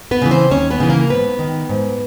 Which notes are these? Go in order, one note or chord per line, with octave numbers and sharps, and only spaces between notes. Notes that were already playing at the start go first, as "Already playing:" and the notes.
B3 B4
C#3 E3
C4 C5
D#2 C#4 C#5
B3 B4
C#3 E3
A#3 A#4
G#2 B3 B4
D#3
G#2